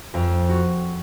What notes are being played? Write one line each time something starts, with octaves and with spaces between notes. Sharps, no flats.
F2
F#4